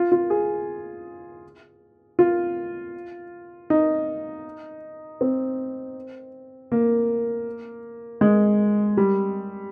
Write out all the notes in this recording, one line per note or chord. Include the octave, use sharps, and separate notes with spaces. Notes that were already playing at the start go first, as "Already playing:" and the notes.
Already playing: F4
F4
G#4
F4
D#4
C4
A#3
G#3
G3